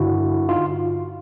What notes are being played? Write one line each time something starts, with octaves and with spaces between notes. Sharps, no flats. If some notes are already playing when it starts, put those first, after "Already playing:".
Already playing: G2 D3 E4 F#4
D#4 F4